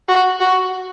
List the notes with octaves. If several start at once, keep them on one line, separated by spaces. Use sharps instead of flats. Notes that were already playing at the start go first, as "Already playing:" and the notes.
F#4
F#4